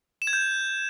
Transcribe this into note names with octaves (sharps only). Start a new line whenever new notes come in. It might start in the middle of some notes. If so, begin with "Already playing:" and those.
E7
G#6
G6